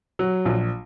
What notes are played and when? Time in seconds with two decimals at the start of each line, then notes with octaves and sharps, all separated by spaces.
0.19 F#3
0.45 A#1